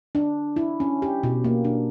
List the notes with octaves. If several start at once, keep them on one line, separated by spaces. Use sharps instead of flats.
D4
E4
C#4
G4
B2
A#3
D4